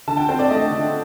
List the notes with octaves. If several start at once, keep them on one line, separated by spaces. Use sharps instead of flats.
D3 A5
G5
C4 C5
D5
A3 D#5
D3